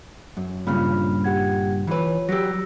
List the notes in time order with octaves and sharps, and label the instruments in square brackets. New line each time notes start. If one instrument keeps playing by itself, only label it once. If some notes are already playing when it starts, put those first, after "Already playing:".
[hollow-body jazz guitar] F#2
[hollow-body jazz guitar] G2 A#2 C#3 [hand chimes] F4 B5 F6
[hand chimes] G4 F#5 G#6
[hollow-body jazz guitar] E3 B4 [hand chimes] F4 C#5
[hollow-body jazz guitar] F#3 G4 [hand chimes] E6 A#6